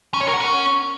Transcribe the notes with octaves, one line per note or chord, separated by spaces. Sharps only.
C#4
C#5
A#4
F#5
C#4